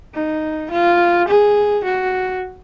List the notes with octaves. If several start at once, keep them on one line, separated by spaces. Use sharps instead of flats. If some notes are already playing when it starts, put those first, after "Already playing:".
D#4
F4
G#4
F#4